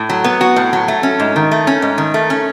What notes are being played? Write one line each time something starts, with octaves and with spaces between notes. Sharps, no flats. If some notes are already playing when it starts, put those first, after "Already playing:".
Already playing: A2
F#3
B3
F#4
A2
F#3
A3
C#4
G#2
D#3
A3
C#4
G#2
D#3
A3
C#4